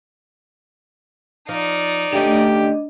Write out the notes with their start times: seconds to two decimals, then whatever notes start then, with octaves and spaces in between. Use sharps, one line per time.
1.49 F3 D#4 D5
2.12 D3 A3 C#4 D4 G4 D#5